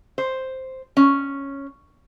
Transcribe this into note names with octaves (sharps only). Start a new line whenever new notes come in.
C5
C#4